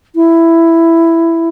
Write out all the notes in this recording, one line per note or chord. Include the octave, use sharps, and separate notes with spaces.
E4